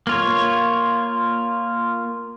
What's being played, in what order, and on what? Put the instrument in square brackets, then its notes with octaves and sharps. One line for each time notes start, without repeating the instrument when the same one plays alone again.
[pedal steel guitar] A#3 F4 C#5